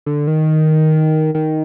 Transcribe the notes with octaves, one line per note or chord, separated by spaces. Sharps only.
D3
D#3
D#3